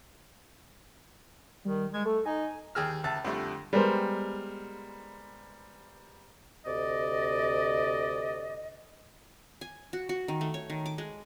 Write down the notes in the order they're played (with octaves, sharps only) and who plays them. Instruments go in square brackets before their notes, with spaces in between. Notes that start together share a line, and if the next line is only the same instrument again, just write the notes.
[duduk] D#3 [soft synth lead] G3
[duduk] G#3 [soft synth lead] G#6
[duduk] A3 [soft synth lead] A4
[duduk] D#4 [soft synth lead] G#5
[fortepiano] D#2 G4 G#4 E6 F6
C#2 E5 A5
F2 D3 G3 A3
[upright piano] G3 G#3 B3 A#4 C5
[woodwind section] D2 C3 D5 D#5
[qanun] G#5
F#4
F#4
D#3
A3
C#5
D#3
D6
G#3